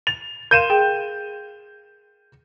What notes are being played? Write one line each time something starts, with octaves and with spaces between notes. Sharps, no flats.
A6 F7
A#4 F5 C6 G6 D#7 E7
G#4 G5